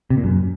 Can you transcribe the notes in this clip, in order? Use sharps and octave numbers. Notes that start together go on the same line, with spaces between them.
C3
A#2
F#2